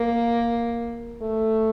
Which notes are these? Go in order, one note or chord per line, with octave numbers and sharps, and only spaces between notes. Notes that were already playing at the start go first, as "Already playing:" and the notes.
Already playing: A#3
A3